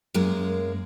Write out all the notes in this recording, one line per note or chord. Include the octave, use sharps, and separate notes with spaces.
F#2 G#3 A#3 A#4